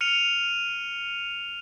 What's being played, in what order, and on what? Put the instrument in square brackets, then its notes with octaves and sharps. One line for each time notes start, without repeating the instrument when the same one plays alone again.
[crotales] F6 C#7 D#7 F7